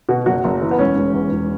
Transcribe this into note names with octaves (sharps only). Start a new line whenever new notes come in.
B2 F#4
F#1 F#4
F#1
E3
B3
E1 C#4
E1
E2
E1